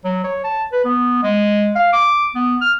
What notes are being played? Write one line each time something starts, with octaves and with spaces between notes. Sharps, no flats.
F#3
C#5
A5
B4
B3
G#3
F5
D6
B3
F6